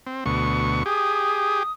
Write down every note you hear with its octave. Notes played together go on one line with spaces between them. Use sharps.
C4
D2 B2 C#6
G4 G#4 D#6